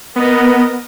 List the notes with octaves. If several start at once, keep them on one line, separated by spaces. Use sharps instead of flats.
B3 A#4 D#5